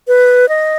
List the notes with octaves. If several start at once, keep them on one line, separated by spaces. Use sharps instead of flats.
B4
D#5